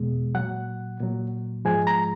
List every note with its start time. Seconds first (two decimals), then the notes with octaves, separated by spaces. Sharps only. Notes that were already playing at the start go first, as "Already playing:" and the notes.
Already playing: E2 B2 G#3
0.35 A#2 F#3 F#5
1.00 A#2 F#3
1.65 G#2 F3 G#3 G#5
1.87 A#5